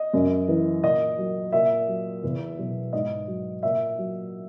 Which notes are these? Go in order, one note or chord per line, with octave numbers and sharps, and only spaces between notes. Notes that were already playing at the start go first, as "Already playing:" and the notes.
Already playing: D#5
F#2
E3
A#2 D#5
F#3
A#2 E5
F#3
E2
B2 F#3
G#2 D#5
F#3
A#2 E5
F#3